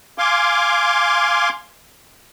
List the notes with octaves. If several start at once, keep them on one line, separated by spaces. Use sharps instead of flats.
F5 G#5 C6 D6